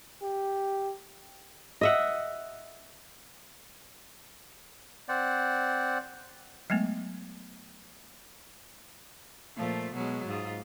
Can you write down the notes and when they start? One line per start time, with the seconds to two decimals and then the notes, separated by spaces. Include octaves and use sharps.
0.22 G4
1.81 D#5 E5 F#5
5.09 C4 C5 D5 F#5
6.70 F#3 G#3 A3 B3
9.56 A#2 F3 A3
9.93 B2 F#3 G#3
10.27 G#2 F4